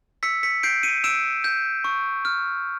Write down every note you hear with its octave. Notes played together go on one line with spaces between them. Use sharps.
E6 B6 C#7
B6 C#7
G6 C7 D7
C#7 D#7
E6 D7 E7
G6
C#6
F6